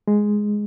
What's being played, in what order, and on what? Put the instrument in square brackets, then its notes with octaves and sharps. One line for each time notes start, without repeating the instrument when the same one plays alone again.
[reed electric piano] G#3